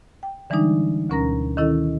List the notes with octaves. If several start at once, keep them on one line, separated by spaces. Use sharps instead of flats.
G5
D3 E3 G3 G#3 D4 D#4
D2 B2 C#4 A#4 A#5 A#6
D#3 C#4 E4 A4 D#5